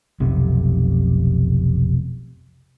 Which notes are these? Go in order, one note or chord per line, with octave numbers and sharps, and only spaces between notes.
F1 B1 C3